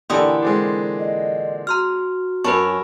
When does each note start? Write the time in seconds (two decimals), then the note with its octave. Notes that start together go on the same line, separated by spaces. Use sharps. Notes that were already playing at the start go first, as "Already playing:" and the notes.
0.10 A#2 D3 E3 G4 A4 C6 D#6
0.42 G#3 C4 D4
1.00 D#5
1.67 F#4 A#5 C6 F6
2.44 F#2 C#4 A#4 B4 A5 B5 C#6